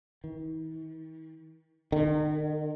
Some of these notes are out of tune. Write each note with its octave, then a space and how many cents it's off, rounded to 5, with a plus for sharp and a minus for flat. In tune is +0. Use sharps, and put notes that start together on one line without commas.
D#3 +45
D#3 -40